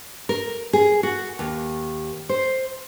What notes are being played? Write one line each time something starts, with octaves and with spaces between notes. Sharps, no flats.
A#4
G#4
F#4
D#2
C5